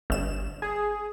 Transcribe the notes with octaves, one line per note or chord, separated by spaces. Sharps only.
G1 E7
G#4